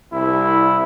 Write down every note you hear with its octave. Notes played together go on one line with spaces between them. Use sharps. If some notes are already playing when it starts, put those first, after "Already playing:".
C2 E4